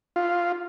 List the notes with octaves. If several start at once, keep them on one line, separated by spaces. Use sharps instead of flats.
F4